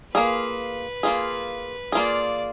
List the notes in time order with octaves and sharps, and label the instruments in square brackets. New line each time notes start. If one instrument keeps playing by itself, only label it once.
[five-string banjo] A#3 F4 G#4 [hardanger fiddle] B4
[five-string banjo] A#3 F4 G#4
[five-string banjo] A#3 F4 G#4 [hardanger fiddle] D5